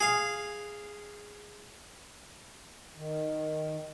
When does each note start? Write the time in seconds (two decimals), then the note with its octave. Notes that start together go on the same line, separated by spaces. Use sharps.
0.01 G#4 F5
2.96 D#3